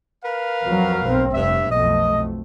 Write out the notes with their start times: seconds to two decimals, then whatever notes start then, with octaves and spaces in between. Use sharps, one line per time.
0.25 A#4 B4 F5
0.65 F2 F#3
1.05 B1 C4
1.34 F1 G2 E5
1.72 B1 F2 A3 D#5